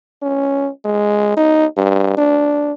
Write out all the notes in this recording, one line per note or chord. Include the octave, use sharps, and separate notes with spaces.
C#4
G#3
D#4
G2
D4